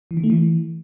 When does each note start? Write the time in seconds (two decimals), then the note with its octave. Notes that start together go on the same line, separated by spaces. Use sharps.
0.11 E3
0.17 D#3
0.24 A3
0.30 E3